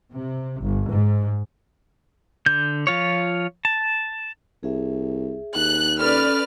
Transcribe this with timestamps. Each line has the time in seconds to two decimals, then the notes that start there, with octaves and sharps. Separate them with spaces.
0.13 C3
0.61 G1
0.90 G#2
2.46 D3 G6
2.87 F3 F4 C#5
3.65 A5
4.63 C2 G#4 E5
5.55 D#2 F#6
5.99 C#4 A4 B4 D5 F6